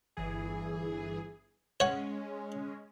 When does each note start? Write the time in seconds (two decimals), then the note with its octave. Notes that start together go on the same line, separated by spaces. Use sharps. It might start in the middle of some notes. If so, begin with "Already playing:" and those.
0.17 G1 E3 G#4
1.80 G#3 C#4 C#5 F#5